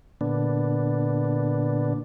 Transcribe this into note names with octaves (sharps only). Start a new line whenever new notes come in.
A#2 D3 B3 D4